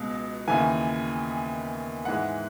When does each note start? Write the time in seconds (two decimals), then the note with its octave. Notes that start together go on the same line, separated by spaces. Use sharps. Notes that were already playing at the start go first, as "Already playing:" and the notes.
Already playing: C#2 B2 G#3
0.48 D#2 C#3 E3 G#5
2.05 G#2 E3 G#3 F#5